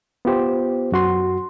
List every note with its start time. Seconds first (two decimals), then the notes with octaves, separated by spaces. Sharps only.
0.25 B3 F4 G4 C5
0.92 F#2 F#4 C6